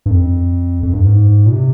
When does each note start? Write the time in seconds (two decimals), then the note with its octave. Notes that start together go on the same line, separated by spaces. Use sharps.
0.06 G2
0.10 F2
0.83 F2
0.93 G2
1.04 G#2
1.46 A#2
1.52 C3